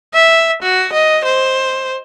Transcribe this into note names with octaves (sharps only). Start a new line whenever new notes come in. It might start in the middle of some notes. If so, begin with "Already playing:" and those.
E5
F#4
D#5
C5